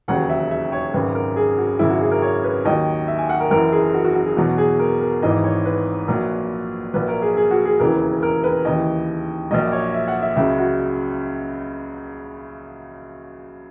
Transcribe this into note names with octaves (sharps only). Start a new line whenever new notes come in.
E1 D#2 C#3 F#3 F#5
E5
E5
C#5
G#1 F#2 C#3 B4
A#4
G#4
F#4
G#1 F#2 C#3 E4
F#4
G#4
A#4
C#5
B4
D#2 D#3 F#3 D#5
E5
G#5
F#5
A#4
F#1 F#2 E3 A#4
G#4
F#4
F#4
F#4
G#4
E2 B2 F#3 F#4
G#4
A#4
A#4
G#1 G#2 E3 D#5
C#5
B4
A#1 A#2 F#3
A#1 A#2 F#3 B4
A#4
G#4
G#4
F#4
G#4
E1 D#2 C#3 E3 A#4
A#4
B4
D#2 C#3 E3 D#5
A#1 A#2 F#3 D#5
C#5
E5
F#5
E5
C#2 C#3 F#3 E5
F#4